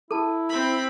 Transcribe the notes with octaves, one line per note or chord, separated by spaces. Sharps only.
E4 A4 A5
C4 B5